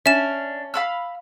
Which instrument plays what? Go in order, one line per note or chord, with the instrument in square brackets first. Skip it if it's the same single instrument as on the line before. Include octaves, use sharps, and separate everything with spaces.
[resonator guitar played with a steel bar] C#4 [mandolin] D4 [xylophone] E5 E7
[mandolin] F5 B5 E6